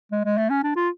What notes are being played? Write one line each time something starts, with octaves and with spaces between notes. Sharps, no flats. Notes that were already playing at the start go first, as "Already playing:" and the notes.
G#3
G#3
A3
C#4
D4
F4